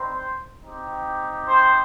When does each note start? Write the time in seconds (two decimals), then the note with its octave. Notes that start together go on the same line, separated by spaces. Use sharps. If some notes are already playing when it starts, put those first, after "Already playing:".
Already playing: G3 C4 D#4 C5
0.64 C4 D#4 G4
1.47 C5